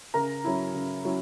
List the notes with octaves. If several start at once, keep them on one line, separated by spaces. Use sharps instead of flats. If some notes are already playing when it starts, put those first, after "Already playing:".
C#3 A#4 A#5
F#3 C#4 E4
C#3
F#3 C#4 E4